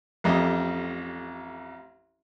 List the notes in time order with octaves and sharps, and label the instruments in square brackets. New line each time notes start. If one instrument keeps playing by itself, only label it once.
[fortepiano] A1 F2 G4 D#5